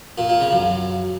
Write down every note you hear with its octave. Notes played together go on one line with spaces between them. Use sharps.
A#2
A#2
C#3
F#2